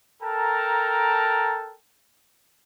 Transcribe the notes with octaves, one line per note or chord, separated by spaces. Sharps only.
A4 A#4 G5 A5 A#5